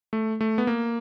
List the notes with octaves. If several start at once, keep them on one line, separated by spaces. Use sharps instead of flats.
A3
A3
B3
A#3